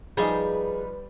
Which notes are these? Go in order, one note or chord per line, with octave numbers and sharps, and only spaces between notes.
F3 G3 D#4 G#4 B4